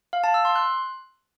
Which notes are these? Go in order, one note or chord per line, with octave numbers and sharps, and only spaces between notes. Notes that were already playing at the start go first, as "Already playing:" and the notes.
F5
A5
E6
C6
F#6